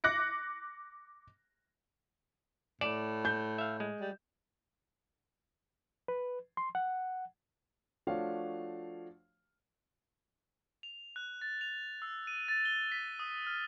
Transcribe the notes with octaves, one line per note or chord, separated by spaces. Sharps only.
D6 F#6 A#6 C#7
A2 D5 E7
G6
E5 F5
G#3
G3
B4
C6
F#5
F3 A3 D4 F#4 C#5 F5
F7
F#6
A6
F7
E6
D#7
A6
G7
B6
D#6
F6